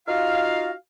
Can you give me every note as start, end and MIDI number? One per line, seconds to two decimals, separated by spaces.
0.07 0.71 63
0.07 0.71 65
0.07 0.71 66
0.07 0.71 77